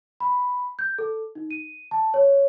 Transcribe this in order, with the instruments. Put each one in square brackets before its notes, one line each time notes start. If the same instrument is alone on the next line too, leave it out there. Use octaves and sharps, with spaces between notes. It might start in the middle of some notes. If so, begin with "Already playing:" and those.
[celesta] B5
G6
A4
D#4
D#7
A5
C#5